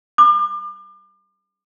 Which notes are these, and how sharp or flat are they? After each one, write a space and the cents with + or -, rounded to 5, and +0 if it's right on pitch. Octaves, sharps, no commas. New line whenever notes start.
D6 +40